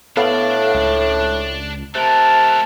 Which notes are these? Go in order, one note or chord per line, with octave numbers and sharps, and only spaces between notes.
A2 B3 D4 A4 D5 F5
C#2
C3 A3 A#4 A5 F#6